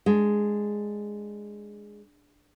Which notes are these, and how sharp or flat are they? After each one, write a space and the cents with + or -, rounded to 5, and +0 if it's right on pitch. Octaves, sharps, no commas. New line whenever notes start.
G#3 +0 D4 +0